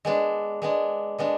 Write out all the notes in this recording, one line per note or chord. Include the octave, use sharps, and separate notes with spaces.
G#3 B3 D4
G#3 B3 D4
G#3 B3 D4